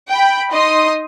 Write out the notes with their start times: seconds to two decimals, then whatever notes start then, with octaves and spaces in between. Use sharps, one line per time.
0.11 G5 B5
0.51 D#4 D#5 C6 D#6